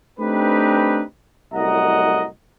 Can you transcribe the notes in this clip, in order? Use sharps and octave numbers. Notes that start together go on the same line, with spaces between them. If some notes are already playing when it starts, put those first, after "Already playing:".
A3 C4 D4 D#4 G4 B4
C2 F#2 A2 D#5 F#5 A#5